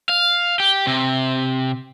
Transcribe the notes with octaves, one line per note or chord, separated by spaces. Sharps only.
F5
G4
C3